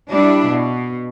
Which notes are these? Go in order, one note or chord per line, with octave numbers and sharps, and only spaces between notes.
G3 D4 E4
B2